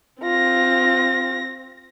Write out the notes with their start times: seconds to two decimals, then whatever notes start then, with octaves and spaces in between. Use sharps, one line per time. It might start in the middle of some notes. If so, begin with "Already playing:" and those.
0.23 C4 F4 A#6